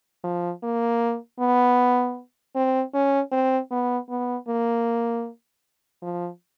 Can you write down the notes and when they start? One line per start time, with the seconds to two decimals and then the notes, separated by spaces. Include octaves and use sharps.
0.24 F3
0.63 A#3
1.40 B3
2.56 C4
2.94 C#4
3.32 C4
3.71 B3
4.10 B3
4.48 A#3
6.02 F3